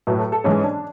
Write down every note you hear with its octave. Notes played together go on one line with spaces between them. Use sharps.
A2 F#3 A3 B4
A4
A4
G#2 E3 G#3 C#4
D4